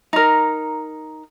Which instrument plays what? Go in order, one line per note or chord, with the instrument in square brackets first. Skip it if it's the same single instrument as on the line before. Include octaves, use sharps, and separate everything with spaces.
[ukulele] D#4 A#4